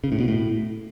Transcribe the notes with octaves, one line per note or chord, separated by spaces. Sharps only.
C#3
A2
B2
A2